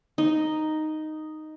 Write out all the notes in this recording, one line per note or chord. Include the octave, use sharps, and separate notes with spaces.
D#4